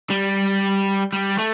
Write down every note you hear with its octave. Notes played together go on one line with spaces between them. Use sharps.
G3
G3
A3